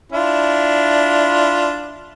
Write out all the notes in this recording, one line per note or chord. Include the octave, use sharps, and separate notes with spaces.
D4 E4 F4